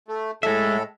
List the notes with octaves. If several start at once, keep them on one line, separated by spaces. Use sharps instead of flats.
A3
A2 G#3 A4 E5